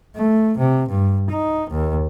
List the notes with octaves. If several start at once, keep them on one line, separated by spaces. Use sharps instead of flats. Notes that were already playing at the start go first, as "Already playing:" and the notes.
A3
C3
G2
D#4
D#2